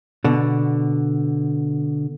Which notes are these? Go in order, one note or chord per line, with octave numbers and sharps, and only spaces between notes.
B2 D3